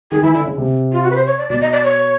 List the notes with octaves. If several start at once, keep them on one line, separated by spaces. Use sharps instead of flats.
D#3 G#4
E3 E4
D3 E4
C#3
C3
F4
F#4
B4
C5
C#5
D5
B2 D5
D#5
D5
C#5